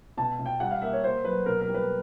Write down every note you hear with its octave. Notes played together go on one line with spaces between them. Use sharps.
B2 A5
B2
G5
G3 F#5
F5
A#3 E5
C#5
A#3 C5
F#3 B4
B2 A#4
A#4
G3
B4